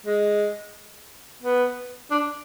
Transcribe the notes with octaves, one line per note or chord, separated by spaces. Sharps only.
G#3
B3
D4